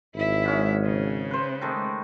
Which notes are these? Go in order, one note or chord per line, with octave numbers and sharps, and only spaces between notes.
G#1 E4 E5
G#2 C#4
C#3
B4 C5
D#3 G#3 A3